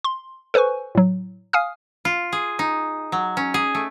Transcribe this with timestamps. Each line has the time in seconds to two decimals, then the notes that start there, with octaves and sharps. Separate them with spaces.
0.04 C6
0.54 A4 B4 C5 G#5 C#6
0.95 A2 F#3
1.53 F5 G#5 D#6 F6
2.05 F4
2.33 G#4
2.59 D#4
3.12 F#3
3.37 C#4
3.54 G#4
3.75 A3